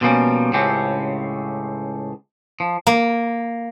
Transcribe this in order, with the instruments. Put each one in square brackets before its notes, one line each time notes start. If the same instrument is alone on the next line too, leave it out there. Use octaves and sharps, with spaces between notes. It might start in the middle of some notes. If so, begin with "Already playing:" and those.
[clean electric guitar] B2 D3 F3 G3 A#3 C#4
C#2 A2 C#3 A3 C4 G4
F3
[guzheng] A#3